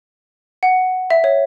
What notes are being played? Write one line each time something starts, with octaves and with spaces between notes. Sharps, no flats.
F#5
E5
C#5